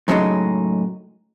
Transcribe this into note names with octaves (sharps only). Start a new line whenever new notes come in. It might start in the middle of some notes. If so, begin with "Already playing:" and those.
F#2 A2 C#3 F#3 G#3 D#4